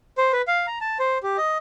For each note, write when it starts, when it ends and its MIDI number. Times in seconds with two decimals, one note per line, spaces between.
0.18 0.32 72
0.33 0.42 71
0.48 0.66 77
0.67 0.79 82
0.81 0.98 81
0.99 1.18 72
1.23 1.37 67
1.37 1.58 75